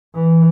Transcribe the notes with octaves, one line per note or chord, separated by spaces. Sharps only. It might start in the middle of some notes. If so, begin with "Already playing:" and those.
E3